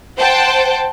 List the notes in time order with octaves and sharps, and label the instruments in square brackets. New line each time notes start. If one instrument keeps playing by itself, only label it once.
[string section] C5 F#5 G5 A5